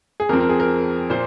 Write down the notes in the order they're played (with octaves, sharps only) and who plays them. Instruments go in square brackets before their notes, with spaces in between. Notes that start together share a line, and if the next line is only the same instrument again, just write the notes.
[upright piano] G#4
F2 A#4
F3 C4
A#4
G#4
A#4
A#2 A#3 C5